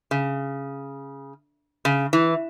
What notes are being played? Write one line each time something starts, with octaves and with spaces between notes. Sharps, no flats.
C#3
C#3
E3